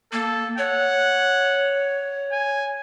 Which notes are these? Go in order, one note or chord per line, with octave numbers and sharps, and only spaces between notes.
A#3 A4
C#5 F#5
G#5